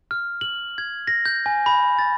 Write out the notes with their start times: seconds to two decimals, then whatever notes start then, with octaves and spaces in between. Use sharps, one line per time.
0.11 F6
0.41 F#7
0.78 G#6
1.07 A#6
1.25 G6
1.46 G#5
1.66 B5
1.99 A6